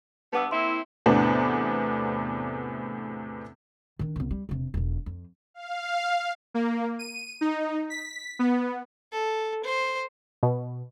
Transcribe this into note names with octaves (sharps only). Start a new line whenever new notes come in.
G2 B3 A5 D6 E6
A#3 C4 E4 C6
E2 A2 C3 B3 D4
D#3 D4
C2 B3
G3
E1 C3
E1 B1
F2
F5
A#3
D#7
D#4
B6
B3
A4
C5
B2